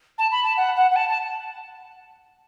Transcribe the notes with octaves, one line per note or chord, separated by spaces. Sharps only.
A5
B5
A5
F#5
F#5
F#5
A5
A5